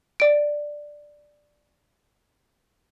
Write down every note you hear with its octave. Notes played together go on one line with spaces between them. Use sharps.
D5 D7